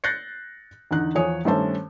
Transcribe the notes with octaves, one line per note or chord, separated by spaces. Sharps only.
F#6 G6 A6 A#6 C7 C#7
E2 D3 D#4 F#6
E2 F3 C#5 G#5 D#6
G2 D#3 A3 C#4 C5 A5